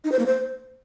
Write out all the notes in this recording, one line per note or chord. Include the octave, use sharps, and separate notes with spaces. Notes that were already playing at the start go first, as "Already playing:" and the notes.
D#4
C5
A#3
C5